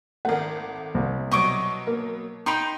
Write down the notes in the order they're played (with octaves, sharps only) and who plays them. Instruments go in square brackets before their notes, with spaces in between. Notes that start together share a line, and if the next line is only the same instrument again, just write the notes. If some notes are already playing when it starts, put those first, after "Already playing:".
[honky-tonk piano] G#1 A3 [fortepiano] A#4 F#5
[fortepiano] C2
[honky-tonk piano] B2 F#3 [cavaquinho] D#5 C#6 D6
[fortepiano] A#3
[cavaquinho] D#4 G5 B5 [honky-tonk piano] C6 D7 F7